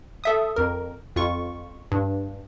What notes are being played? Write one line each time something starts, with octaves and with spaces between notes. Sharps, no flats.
A4 E5 D#6
F2 A#4
F2 F4 C#6
G2